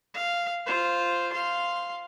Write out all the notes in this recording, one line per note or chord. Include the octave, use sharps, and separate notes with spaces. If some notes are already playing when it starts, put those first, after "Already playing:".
F5
F4 C5
F5 C6